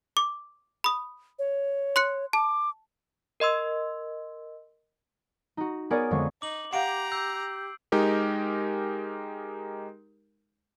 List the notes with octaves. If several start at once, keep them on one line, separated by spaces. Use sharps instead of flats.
D6
B5 D#6
C#5
C6 F#6 C#7
A5 D6
A#4 D#5 C6 E6
D#4 F#4
B3 G#4 A#4 C#5 D5 G#5
F2 D3 G#3 C#6
D#4 D6 F#7
G4 F5 F#5 A#5 C7 D7
E6 G6 C7
G#3 D#4 G4 A#4